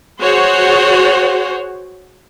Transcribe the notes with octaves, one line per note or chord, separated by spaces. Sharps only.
F#4 G#4 C5 C#5 F#5